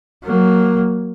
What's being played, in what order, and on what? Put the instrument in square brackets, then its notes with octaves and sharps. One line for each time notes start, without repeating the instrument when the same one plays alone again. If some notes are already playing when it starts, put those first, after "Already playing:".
[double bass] F#3 A#3